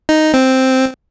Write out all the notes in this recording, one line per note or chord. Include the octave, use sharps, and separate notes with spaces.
D#4
C4